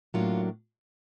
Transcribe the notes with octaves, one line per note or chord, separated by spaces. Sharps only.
A2 F#3 A#3 D4 F4